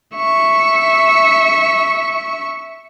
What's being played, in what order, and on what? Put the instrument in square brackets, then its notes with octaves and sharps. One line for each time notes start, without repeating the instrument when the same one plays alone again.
[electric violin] E5 C#6